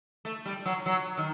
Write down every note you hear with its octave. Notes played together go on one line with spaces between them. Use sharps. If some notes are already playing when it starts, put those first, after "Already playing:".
A3
G3
F#3
F#3
D#3